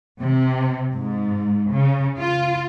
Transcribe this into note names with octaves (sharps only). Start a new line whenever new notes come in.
C3
G#2
C#3
F4